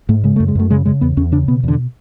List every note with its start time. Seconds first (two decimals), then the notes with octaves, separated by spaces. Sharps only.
0.09 G#2 A3
0.24 C#3 G#3
0.36 F#2 A3
0.48 G#3
0.55 F#2 A3
0.70 C#3 G#3
0.85 C#3 G#3
1.01 E2 B3
1.17 E2 C#4
1.32 C#3 D4
1.48 B2 B3
1.63 E2 D3